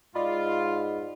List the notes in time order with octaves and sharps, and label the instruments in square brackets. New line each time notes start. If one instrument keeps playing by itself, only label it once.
[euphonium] G#2 [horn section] F4 [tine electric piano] D5 D#5 B5